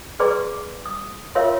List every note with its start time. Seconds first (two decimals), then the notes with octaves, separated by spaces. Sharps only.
0.19 G#4 B4 D5 A#5 C6 D6
0.86 D#6
1.35 F4 A#4 C#5 E5 F5 C6